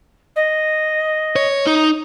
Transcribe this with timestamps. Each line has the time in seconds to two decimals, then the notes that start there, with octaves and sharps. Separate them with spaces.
0.36 D#5
1.36 C#5
1.67 D#4